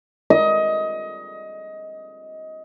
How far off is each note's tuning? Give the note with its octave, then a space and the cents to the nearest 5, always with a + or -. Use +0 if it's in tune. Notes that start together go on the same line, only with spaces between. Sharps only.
D#5 +20